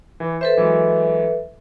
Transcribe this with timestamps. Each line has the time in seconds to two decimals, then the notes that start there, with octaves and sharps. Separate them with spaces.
0.20 E3
0.41 A4 B4 C5 E5
0.57 E3 F#3 G#3